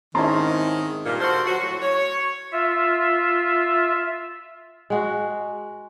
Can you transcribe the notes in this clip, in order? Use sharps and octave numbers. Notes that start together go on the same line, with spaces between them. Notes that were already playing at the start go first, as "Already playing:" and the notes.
G#2 D#3 C4 C#4 E4 A5 A#5 C6
G2 A#2
F#4 A4 A#4 C5
F#3 F#4
A2 F#3 F#4
C#5
F4 E5
G#3 F#4